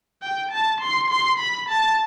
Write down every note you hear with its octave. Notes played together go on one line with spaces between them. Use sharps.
G5
A5
C6
C6
B5
A5